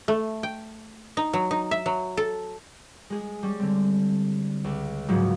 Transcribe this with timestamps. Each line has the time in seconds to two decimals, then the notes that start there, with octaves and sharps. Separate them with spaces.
0.08 A3
0.43 G5
1.17 D#4
1.33 F#3
1.51 D#4
1.71 E5
1.86 F#3
2.17 A4
3.10 G#3 G#4
3.43 G3 C#4
3.59 D3 C4
4.64 C#2
5.08 G#2 C#3 F3 F#3 G#3